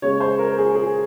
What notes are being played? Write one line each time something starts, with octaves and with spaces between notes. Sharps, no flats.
C#3 G#3 C#5
C5
A#4
G#4
G#4